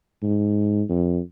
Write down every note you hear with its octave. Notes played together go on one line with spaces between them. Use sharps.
G#2
F2